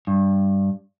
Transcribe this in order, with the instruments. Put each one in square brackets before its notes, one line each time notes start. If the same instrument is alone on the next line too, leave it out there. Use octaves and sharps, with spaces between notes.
[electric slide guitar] G2